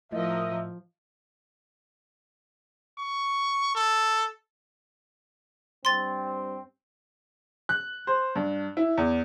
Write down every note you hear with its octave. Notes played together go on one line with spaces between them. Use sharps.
A2 F3 A#4 D#5 E5
C#6
A4
G2 C4 C6 A6
F#6
C5
G2
E4
E2